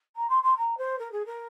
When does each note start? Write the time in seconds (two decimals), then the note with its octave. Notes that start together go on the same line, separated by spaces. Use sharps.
0.16 A#5
0.29 C6
0.43 C6
0.57 A#5
0.77 C5
0.99 A#4
1.12 G#4
1.26 A#4